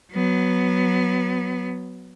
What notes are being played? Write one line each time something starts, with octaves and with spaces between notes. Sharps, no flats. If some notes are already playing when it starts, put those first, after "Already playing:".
F#3 B3